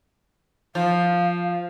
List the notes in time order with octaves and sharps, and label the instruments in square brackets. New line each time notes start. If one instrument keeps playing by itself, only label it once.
[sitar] F3 [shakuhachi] F5